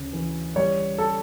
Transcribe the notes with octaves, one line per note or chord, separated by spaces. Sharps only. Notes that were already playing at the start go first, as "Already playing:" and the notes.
Already playing: D2 C#3
E3
G3 C#5
A4